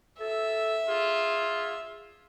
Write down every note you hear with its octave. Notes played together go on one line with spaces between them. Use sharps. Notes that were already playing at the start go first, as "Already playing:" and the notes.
A4 E5
F4 G#4